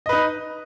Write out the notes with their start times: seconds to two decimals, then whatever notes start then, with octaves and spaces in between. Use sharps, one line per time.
0.06 D#5
0.09 B4
0.13 D#4